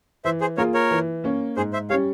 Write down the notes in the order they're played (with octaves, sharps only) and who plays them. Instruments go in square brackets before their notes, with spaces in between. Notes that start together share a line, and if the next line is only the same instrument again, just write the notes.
[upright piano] E3 [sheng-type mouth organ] C5 E5
[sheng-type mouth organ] G#4 C5
[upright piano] A#3 F4 G#4 [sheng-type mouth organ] A#4 C#5
[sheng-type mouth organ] A#4 C#5
[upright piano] E3
A#3 C#4
[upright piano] G#2 [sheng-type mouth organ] G#4 C5
[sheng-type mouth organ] C5 E5
[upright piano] G3 C#4 [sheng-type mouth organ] C#5 F5